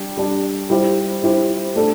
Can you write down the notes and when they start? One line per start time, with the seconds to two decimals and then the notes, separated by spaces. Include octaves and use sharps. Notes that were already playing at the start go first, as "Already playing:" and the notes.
Already playing: G3 D4 G4
0.17 G3 D4 G4
0.70 G3 E4 G4 C5
1.22 G3 E4 G4 C5
1.75 A3 D4 A4